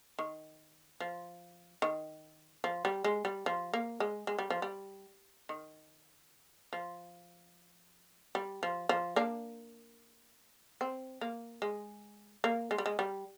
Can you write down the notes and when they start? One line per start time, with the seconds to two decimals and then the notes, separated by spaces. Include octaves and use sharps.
0.19 D#3
1.00 F3
1.82 D#3
2.64 F3
2.85 G3
3.04 G#3
3.25 G3
3.46 F3
3.74 A#3
4.00 G#3
4.27 G#3
4.39 G3
4.50 F3
4.62 G3
5.49 D#3
6.73 F3
8.35 G3
8.63 F3
8.89 F3
9.16 A#3 D4
10.81 C4
11.21 A#3
11.62 G#3
12.44 A#3
12.71 G#3
12.78 G3
12.86 G#3
12.99 G3